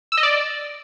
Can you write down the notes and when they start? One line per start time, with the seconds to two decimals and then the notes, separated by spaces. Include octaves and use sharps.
0.12 E6
0.17 D#5
0.23 D5